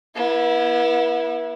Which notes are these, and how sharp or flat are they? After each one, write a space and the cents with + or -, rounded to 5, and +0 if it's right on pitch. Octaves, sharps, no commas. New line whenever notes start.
B3 -35 E4 +0